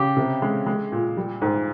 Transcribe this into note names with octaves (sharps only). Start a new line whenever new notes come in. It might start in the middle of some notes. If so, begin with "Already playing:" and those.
Already playing: C#3 G4
C3
G#3
G#3
A#2
G3
G#2